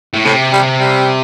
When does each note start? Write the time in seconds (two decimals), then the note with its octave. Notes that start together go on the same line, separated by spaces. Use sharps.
0.14 A2
0.25 A2 C3
0.52 G3
0.80 G3